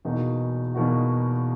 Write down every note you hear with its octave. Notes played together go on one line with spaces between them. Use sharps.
E2 B2 A#3 D#4 F#4
E2 B2 A#3 D#4 F#4